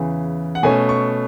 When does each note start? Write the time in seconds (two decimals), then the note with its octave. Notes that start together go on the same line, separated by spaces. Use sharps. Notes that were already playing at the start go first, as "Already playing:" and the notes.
Already playing: E2 C#3 E3
0.55 F#5
0.63 B2 A3 C#4 G#5
0.89 C#6